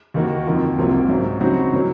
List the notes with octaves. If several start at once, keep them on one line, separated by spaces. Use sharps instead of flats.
D#2 D#3 A#3 D#4 F#4
F2 D#3 A#3 F4
C2 C3 F#3 A#3 F4
G#2 F#3 C#4
C#3 F#3 C4 D#4 F#4
C#3 F#3 A#3 C#4